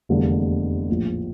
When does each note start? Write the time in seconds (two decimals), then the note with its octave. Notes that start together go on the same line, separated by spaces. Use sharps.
0.09 F1 E2 D3 G3 A#3
0.89 A#1 A2 F3